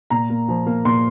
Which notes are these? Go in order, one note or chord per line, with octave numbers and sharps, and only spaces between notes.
A#2 A#5
A#3
F3
A#3
A#2 C6